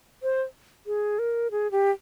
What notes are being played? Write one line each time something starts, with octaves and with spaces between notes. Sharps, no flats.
C5
G#4
A#4
G#4
G4